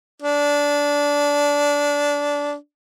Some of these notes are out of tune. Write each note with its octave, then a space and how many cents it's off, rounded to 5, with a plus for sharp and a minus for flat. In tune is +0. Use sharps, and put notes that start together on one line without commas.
D4 -20